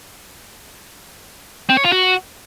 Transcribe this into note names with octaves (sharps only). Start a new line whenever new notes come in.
C4
C#5
F4
F#4